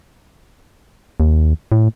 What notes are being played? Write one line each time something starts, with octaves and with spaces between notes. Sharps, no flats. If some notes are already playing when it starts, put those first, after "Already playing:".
D#2
A2